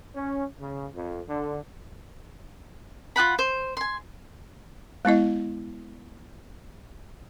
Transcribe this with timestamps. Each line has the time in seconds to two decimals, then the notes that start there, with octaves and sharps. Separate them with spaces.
0.15 C#4
0.60 C#3
0.94 F2
1.28 D3
3.16 F4 G#4 F#5 B5
3.39 C5
3.77 G#5 C6
5.05 G#3 B3 E4 D#5